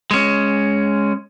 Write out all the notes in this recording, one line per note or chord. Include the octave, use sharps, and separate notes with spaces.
G#3 C#4